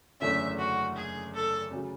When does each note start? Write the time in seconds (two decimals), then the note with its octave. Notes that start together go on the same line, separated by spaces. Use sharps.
0.20 F#1 E2 D3 A3 C#4 E5
0.58 F#4
0.96 G#4
1.34 A4
1.71 D2 C#3 F#3